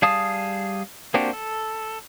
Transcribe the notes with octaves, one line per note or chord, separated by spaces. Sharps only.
G3 G#4 F5 A5 D#6
A#3 C4 D4 F#4 G4
A4